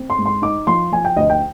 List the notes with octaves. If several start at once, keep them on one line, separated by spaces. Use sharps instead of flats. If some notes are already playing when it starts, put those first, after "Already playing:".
Already playing: C4
C6
G#2
C6
D#4 D6
F3 C6
F3 G#5
G5
D2 D#5
G5